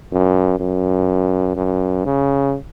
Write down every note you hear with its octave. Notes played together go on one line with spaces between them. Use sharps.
F#2
F#2
F#2
C#3